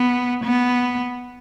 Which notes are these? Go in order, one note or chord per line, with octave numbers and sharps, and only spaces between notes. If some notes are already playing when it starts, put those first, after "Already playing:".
Already playing: B3
B3